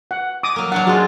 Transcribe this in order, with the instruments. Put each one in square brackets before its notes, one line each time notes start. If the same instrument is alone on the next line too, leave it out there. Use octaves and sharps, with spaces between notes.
[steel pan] F#5
D6 D#6
[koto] F#3 A#3
[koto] F#3 A#3 D4 [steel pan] F#5
[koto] G#3 F4 [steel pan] F#4 G#4